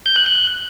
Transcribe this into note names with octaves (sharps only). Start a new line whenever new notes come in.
G6
F#6
F#6